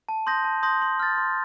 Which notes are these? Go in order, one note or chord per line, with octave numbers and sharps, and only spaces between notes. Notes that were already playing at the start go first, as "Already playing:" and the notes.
A5
C6 D#6 G6 A#6
A5
C6 D#6 G6 A#6
C6
F6 A6
C6